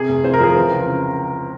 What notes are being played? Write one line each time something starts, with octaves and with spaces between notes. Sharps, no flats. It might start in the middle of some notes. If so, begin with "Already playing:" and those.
Already playing: C3 G#4
F1
F2 C5
A#4
F3 G#4
E3 A#4
C#2
C#3